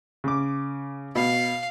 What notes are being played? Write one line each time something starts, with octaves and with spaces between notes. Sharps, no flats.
C#3 D6
B2 F5